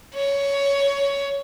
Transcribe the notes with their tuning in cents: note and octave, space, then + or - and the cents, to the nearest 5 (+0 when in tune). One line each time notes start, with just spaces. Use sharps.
C#5 +10